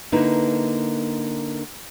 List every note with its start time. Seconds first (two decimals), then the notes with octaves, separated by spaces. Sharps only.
0.12 D3 A#3 D#4 E4 B4